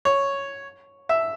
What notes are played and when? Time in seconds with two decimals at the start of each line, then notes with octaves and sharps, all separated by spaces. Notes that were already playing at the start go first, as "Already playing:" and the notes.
0.05 C#5
1.09 E5